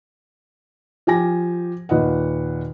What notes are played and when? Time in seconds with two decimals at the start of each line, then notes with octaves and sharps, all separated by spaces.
1.07 F3 G4 G#5 A#6
1.89 D#2 A#2 B4 D#5 F#5